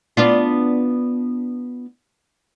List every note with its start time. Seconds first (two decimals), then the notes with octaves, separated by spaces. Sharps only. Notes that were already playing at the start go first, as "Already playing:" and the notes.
0.17 B3 D4 F4